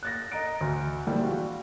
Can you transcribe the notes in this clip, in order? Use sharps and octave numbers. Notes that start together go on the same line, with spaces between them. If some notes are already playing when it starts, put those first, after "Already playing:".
F#6 A6 A#6
D#5 A#5 A#6 D7
D2
A#1 E3 G3 G#3
F4 F#4